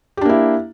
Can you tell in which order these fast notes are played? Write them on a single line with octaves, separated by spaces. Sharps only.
G4 D4 A#3 E4